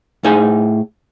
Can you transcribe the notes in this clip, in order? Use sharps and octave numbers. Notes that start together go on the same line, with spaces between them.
A2 D#4 G#4 F5 G#5